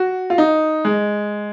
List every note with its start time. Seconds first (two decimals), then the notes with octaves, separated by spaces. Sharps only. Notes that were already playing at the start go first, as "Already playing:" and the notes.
Already playing: F#4
0.30 F4
0.38 D#4
0.85 G#3